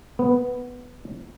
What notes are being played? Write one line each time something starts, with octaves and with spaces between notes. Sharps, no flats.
B3